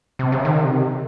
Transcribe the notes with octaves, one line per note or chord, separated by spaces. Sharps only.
C3
C#3
D#3
C3